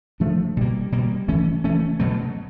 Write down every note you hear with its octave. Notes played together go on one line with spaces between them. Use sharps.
F3 A3 D4
B2 G3 A#3
B2 G3 A#3
E3 A3 C#4
E3 A3 C#4
B2 F#3 A3